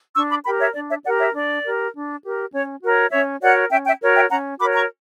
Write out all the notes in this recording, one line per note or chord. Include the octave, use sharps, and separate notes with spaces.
D4 C#6 E6
B5 D6
G4 A#4 G5 B5
C#5 E5
D4 D5
C#5 E5
G4 A#4 D5 F#5
C#5 E5
D4 D5
G4 A#4
D4
G4 A#4
C#4 C#5
F#4 A#4 C#5
C#4 C#5 E5
F#4 A#4 C#5 D5 F#5
C#4 E5 G5
E5 G5
F#4 A#4 C#5
E5 G5
C#4 F#5 A#5
F#4 A#4 C#5 B5 D6
A#5 C#6